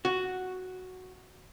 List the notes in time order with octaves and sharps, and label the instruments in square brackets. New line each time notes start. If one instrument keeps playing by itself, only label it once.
[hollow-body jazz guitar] F#4